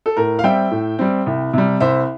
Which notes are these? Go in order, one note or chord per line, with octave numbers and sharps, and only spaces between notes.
A4
A2 A#4
F5
G3 C4 E5 G5
A2
G3 C4
C2
C3 G3
C2 C5 E5